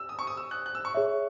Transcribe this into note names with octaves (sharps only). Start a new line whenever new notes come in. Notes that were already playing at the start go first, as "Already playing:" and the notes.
Already playing: E6
D#6
C#6
D#6
E6
F#6
F#6
E6
C#6
G#4 C#5 E5